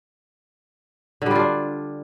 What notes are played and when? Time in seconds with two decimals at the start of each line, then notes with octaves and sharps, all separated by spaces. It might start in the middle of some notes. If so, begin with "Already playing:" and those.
1.22 D3
1.26 G3
1.31 F4
1.35 D4